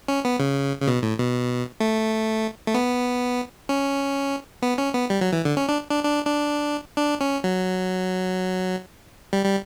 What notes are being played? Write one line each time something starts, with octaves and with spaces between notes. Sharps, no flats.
C#4
B3
C#3
C#3
B2
A2
B2
A3
A3
B3
C#4
B3
C#4
B3
G3
F#3
E3
D3
C#4
D4
D4
D4
D4
D4
C#4
F#3
G3
G3